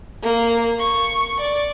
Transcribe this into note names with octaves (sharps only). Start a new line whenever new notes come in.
A#3
C#6
D5